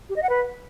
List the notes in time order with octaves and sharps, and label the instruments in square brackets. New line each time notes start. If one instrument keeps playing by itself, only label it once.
[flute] G4
D#5
F#5
B4